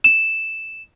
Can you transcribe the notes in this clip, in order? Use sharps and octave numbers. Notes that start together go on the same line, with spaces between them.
E7